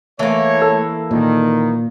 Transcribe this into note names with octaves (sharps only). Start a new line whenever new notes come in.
E3 A3 A#3 C#5
A4 E6
A#2 D#3